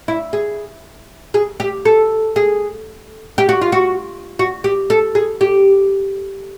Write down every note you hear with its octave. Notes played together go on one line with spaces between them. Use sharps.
E4
G#4
G#4
G4
A4
G#4
G4
F#4
F4
F#4
F#4
G4
A4
G#4
G4